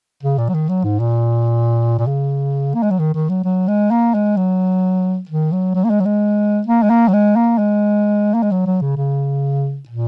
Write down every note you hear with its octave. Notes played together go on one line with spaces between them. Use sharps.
C#3
A#2
F#3
D#3
F#3
G#2
A#2
A#2
C#3
A#3
G#3
F#3
D#3
D#3
F#3
F#3
G#3
A#3
G#3
F#3
D#3
F#3
F#3
A#3
G#3
F#3
G#3
A#3
G#3
A#3
F#3
G#3
A#3
G#3
A#3
G#3
F#3
F#3
C#3
C#3
A#2